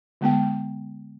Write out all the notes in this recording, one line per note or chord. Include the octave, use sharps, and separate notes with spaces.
D3 G#3 B3 G5